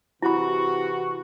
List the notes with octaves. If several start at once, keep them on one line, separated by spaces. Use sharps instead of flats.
C3 E3 E4 F#4 B5